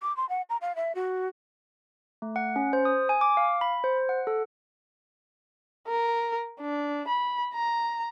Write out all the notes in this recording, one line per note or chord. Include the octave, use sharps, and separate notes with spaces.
D6
C6
F#5
A#5
F5
E5
F#4
A3
F#5
C#4
C5
D#6
G#5
D6
F5
B5
C5
F#5
A4
A#4
D4
B5
A#5